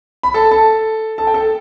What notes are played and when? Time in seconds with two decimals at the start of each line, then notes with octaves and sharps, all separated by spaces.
0.23 B5
0.34 A4 A5
0.51 A4 A5
1.18 A4 A5
1.27 G5
1.34 A4 A5